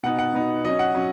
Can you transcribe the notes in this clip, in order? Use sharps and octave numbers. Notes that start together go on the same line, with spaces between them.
B2 B3 D#4 F#5
F#5
B2 B3 D#4
F#3 C#4 D#5
F#5
F#3 C#4